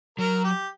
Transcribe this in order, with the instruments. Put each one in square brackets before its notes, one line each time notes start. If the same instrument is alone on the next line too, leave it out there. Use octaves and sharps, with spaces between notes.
[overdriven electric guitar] F#3 [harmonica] A#4
[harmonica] G4